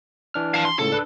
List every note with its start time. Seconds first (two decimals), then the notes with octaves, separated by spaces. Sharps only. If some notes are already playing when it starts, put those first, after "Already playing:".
0.34 E3 D4 F6
0.54 F5 A5
0.65 C6
0.79 C#2 A2 C#3 A4
0.92 D4 B4